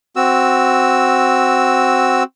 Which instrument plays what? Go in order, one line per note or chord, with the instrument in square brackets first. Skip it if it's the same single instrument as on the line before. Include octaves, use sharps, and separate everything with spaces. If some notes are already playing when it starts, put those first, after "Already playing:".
[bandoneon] C4 F#4 E6